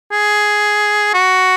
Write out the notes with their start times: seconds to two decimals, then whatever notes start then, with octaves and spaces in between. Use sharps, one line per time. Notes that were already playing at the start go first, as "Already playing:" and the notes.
0.12 G#4
1.14 F#4